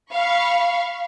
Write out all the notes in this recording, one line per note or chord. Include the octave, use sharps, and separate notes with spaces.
F5 B5 C#6